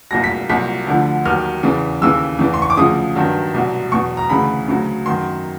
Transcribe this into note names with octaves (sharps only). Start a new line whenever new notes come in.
C2 A#2 F#3 A#6
B6
C2 A#2 F#3 B6
D2 D3 F3
D#2 D#3 F#3 F6
E2 C#3 E3
D#2 C#3 E3 E6
E2 C#3 E3
C6
C#6
D6
D2 C#3 F3 D#6
G2 D#3 F#3
C2 B2 F#3
E2 B2 F#3 C#6
A#5
D2 C#3 E3 B5
D2 C#3 F#3
F#2 D#3 F#3 C6